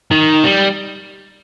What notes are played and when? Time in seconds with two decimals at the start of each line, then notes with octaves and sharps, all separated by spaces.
0.11 D#3
0.44 G3